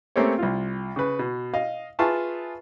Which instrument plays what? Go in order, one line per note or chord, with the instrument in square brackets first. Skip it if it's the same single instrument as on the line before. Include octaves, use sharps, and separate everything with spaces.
[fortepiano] A3 A#3 C4 C#4 G4 C#5
C2 F4
C#3 B4
B2
D#5 F5
F4 G#4 B4 E5 A5 C#6